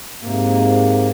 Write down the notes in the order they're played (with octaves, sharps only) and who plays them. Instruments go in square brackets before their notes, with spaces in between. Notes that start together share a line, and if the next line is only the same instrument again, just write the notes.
[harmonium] G#2 C3 A#3